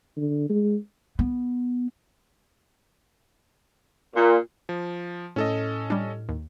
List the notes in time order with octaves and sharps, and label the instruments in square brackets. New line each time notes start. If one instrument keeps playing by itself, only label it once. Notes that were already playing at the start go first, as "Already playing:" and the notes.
[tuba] D3
G#3
[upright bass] B3
[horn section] A#2
[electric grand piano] F3
[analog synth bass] A2 [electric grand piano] C#4 A4 D#5
[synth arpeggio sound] G3 D4
D#2